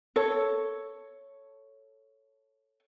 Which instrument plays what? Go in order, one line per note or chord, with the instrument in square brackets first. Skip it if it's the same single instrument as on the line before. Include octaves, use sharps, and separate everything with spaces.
[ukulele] A4 C#5